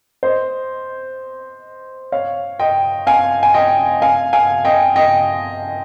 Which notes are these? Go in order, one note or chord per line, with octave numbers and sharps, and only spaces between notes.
C5 D#5
C#5 F5
D#5 G5
F5 G#5
G#5
D#5 G5
F5 G#5
F5 G#5
D#5 G5
D#5 G5